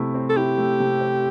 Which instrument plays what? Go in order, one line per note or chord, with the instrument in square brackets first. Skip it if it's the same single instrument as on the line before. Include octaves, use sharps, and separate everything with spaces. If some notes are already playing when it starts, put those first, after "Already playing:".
Already playing: [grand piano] C3 A3 E4
C4
[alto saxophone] A4
[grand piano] E4 [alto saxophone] G4
[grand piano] A3
C3
C4